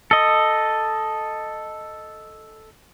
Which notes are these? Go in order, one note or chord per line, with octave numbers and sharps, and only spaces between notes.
A4 D#5